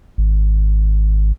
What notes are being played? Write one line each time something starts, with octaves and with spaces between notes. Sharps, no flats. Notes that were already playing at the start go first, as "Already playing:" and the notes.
G#1